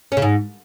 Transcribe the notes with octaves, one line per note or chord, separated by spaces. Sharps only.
C#4
C#3
G#2